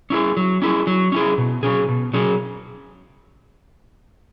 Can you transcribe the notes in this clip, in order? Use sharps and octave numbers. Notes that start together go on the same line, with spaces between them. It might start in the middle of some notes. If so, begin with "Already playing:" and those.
C#4 E4 G#4
F#3
C#4 E4 G#4
F#3
C#4 E4 G#4
B2
F#3 C#4 G#4
B2
F#3 C#4 G#4